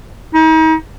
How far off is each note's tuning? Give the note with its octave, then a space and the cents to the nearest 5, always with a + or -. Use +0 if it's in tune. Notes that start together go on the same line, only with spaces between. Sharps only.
D#4 +40